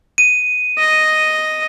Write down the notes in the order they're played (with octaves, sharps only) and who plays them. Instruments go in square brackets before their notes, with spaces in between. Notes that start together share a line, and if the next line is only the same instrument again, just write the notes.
[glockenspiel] D#7
[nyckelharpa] D#5